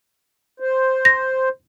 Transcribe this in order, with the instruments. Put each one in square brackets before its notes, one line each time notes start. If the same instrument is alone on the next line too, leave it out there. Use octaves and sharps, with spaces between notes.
[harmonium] C5
[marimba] A#6